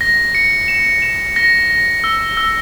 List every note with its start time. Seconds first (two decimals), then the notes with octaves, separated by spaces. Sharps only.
0.01 A#6
0.35 C#7
0.68 E7
1.02 E7
1.36 A#6
1.70 A#6
2.04 E6
2.37 E6